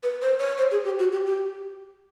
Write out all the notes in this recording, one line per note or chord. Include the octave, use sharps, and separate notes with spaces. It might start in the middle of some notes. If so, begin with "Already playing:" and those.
B4
C5
C#5
C5
G#4
G4
F#4
G4
G4